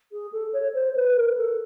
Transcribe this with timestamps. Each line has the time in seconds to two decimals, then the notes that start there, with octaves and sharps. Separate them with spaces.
0.11 G#4
0.32 A4
0.53 C#5
0.74 C5
0.95 B4
1.16 A#4
1.37 A4